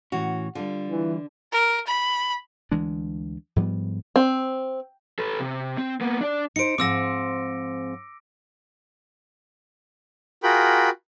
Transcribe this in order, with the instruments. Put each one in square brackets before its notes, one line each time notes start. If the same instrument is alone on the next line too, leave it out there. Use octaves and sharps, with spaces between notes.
[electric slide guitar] A2 E3 C#4 [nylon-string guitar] F#4
[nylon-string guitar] D3 [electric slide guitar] G3 F4
[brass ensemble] E3
[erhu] A#4
B5
[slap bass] D2 E3 G#3 D4
G#2 F3 G3 B3
[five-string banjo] C4
[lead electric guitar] A4 B4
C3
C4
A#3 B3
D4 D5
[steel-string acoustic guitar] D#4 C5 [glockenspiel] C#7 D7
[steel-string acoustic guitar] G#2 F3 C4 [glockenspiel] D6 E6 A#6
[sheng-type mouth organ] F4 F#4 G#4 A#4 G5 B5